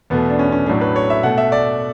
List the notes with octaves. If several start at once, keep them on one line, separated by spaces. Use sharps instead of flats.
E2 B2 A3 B3
D4
C#4
C#4
A2 F#3 A3 D4
B4
C#5
E5
B2 A3 F#5
E5
D5